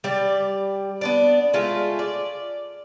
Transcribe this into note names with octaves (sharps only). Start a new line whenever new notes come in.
G3 D5
B3 D4 D5
G#3 A3 F4
D5